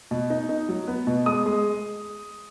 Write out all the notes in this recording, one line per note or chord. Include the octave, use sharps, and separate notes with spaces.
B2
D#4
D#4
F#3
B3
B2
G#3 D#6
G#3